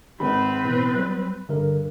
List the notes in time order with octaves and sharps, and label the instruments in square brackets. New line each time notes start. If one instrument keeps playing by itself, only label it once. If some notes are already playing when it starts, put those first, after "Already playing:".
[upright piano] G#1 G#3 [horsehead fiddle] C4 B4 [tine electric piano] B5
[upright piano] A1 [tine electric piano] B2 B3
[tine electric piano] F#3 G3 [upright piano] F#6
[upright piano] G2 [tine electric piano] D3 A#4